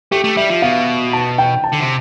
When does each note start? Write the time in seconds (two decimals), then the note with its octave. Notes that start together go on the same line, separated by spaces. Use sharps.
0.11 A3 G4
0.24 A3
0.37 G3 E5
0.50 F3
0.62 B2 F5
1.13 A5
1.38 G5
1.64 A5
1.72 D3
1.80 C3